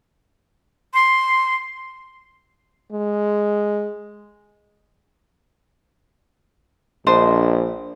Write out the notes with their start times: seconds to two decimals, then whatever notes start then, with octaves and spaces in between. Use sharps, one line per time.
0.94 C6
2.92 G#3
7.07 A#1 D4 C5 D#5